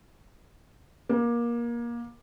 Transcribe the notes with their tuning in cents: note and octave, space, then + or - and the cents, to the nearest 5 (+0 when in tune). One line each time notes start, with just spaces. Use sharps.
A#3 +25